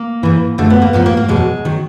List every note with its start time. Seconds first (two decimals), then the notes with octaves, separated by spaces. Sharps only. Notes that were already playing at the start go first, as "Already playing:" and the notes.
Already playing: A#3
0.23 G#2 E3
0.58 F#2 D3 F3 A3
0.70 B3
0.82 A#3
0.93 G#2 F3 B3
1.06 A#3
1.17 A#3
1.28 E2 B2 F#3 G#3
1.65 D#3 F#3